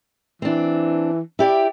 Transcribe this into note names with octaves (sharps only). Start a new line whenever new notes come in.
E3 C4 D4
E4 G4 D5